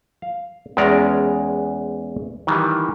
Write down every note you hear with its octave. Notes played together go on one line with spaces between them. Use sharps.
F5
E2 G#3 C#4 D5 A#5
D#3 E3 G3